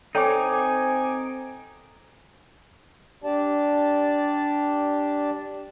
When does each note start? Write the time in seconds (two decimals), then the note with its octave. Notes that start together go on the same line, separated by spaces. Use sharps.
0.15 C4 D#4 A4 C#5 G5 G#5 D6
3.24 D4 G4 D5 A5